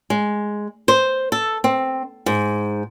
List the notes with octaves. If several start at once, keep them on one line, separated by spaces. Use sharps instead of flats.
G#3
C5
A4
C4
G#2